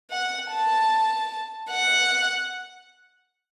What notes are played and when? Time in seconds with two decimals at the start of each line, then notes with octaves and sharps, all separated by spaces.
0.11 F#5
0.51 A5
1.71 F#5